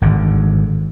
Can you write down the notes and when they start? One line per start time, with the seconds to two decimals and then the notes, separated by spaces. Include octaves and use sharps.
0.02 G#1 D3